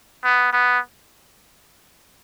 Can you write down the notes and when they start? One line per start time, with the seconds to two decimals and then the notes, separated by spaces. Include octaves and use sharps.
0.24 B3
0.53 B3